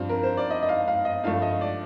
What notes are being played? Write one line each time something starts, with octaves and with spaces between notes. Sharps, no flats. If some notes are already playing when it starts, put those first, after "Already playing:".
Already playing: G2 F3 C4 F5
A#4
C5
D5
D#5
D#5
F5
F5
D#5
G2 F3 A3 F5
D#5
D5